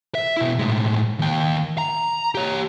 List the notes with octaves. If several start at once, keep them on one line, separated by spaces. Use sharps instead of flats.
E5
B2 E4
A2 G#3
D#2 G5
A#5
G4 C#5